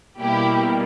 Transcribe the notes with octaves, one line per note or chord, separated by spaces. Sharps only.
B2 G3 A#3 E4 G4